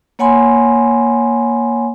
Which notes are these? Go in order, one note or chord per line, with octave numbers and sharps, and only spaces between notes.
A#3 C#5 F#5 G#5 B5 C6